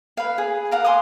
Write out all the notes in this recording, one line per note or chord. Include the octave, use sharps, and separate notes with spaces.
B4 F5
G#4
A#4 F5 F#5
G#5 C6 D6 D#6